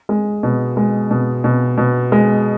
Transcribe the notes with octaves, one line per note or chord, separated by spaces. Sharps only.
G#3
B2
G#3
B2
B2
B2
G#3